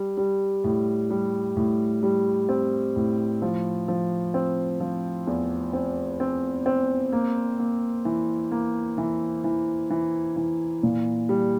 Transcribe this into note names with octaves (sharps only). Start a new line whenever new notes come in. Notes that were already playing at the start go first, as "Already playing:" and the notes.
Already playing: G3
G3
A2
G3
A2
G3
C4
A2
F3
F3
C4
F3
E2
C4
C4
C4
A#3
A#3
E3
A#3
E3
E3
E3
E3
A#2
G3